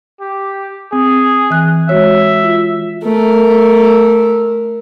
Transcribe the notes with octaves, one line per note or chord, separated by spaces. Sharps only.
G4
C4 G#4
E3 F#6
G#3 F#4 C#5 E5
F4
A3 A#4